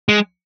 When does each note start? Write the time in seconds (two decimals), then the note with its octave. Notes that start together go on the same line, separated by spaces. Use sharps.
0.09 G#3